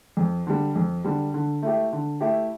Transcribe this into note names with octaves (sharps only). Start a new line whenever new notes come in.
F2
D3 G3
F2
D3 G3
D3
A3 E4 G4
D3
A3 E4 G4